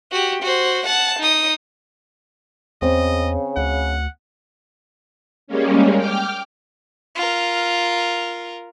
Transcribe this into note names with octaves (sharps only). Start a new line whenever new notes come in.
F#4 G4
F#4 C5
F#5 A5
D#4 D#6
E2 C#3 C4 D#5
D2 F#5
G3 G#3 A#3 C#4
G5 D6 F6
F4 A#4